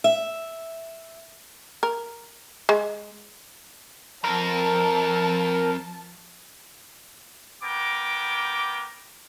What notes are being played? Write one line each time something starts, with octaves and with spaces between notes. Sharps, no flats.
E5
A#4
G#3
F2 F3 A#4 A5
B3 A#4 G5 D6